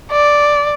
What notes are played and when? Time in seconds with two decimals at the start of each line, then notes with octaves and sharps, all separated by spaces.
0.11 D5